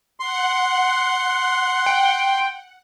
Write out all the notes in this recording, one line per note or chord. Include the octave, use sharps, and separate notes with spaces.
F#5 C6
G5